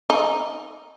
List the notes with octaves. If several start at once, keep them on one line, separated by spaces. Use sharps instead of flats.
D#4